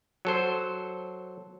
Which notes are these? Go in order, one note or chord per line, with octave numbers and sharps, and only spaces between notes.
F#3 A4 C5